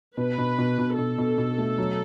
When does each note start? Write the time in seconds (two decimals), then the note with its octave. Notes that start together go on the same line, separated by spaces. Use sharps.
0.17 B2 B4
0.38 B2
0.58 B2
0.78 B2
0.98 B2 A4
1.18 B2
1.38 B2
1.58 A3
1.78 F#3